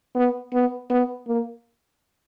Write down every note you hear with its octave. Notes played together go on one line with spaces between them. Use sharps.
B3
B3
B3
A#3